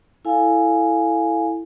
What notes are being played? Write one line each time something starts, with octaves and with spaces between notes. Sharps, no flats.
E4 A4 F5 G#5